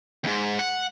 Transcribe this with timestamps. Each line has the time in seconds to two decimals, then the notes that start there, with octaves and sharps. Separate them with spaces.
0.24 D#2 G#2
0.59 F#5